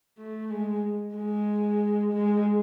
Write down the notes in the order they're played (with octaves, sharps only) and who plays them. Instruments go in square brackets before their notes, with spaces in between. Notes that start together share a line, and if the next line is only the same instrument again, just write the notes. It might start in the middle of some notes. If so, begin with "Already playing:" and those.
[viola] A3
G#3
G#3
G#3